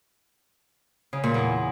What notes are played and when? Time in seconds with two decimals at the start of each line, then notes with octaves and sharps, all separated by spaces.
1.13 C#3
1.23 A#2
1.34 E2